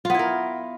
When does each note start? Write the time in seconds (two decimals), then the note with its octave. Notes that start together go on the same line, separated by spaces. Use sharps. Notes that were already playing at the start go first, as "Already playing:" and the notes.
0.05 F4
0.10 B3
0.14 E4
0.19 A#4